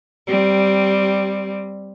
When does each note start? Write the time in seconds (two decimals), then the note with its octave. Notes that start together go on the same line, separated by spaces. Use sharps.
0.27 G3 C4